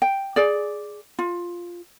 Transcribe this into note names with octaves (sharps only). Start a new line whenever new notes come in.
G5
G#4 D5
F4